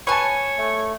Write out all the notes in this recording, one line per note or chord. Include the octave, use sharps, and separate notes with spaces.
B4 C#5 G#5 A5 C#6
A3